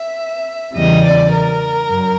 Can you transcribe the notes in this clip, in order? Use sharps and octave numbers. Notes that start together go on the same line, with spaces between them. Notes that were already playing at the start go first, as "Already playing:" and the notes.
Already playing: E5
E2 C#3 E3 G3 D#5
D5
A#4
F#2